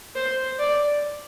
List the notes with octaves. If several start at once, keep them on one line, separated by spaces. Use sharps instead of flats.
C5
D5